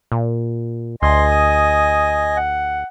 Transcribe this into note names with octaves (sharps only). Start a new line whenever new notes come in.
A#2
D2 D#5 G#5 C6
D#6
F#5